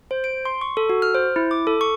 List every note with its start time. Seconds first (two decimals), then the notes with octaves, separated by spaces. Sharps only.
0.11 C5
0.24 D7
0.45 C6
0.61 C#6
0.77 A4
0.89 F#4
1.02 F6
1.15 C5
1.36 E4
1.51 D6
1.67 A4
1.81 C#6